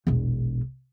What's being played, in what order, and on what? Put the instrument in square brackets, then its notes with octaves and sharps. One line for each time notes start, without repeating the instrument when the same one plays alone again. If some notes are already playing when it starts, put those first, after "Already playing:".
[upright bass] E1 A#1